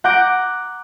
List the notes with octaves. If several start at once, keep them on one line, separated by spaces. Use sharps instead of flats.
F#5 A#5 D6 G6 A#6 D7